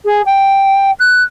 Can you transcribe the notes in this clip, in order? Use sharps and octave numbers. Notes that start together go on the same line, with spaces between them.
G#4
G5
F#6